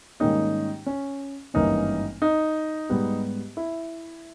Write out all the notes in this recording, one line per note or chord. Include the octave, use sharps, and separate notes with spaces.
G#2 D#3 G3 A#3 C#4 D#4
C#4
G#1 G2 E3 A#3 C#4 D#4
D#4
G#2 G3 B3
E4